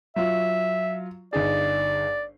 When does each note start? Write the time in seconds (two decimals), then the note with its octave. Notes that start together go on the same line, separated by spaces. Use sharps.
0.16 F#3 F4 E5
1.33 G1 D#4 G#4 D5